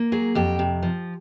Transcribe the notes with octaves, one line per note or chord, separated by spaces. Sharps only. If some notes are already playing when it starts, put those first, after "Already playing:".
Already playing: A#3
F#3 G#4
F2 G4
C3
F3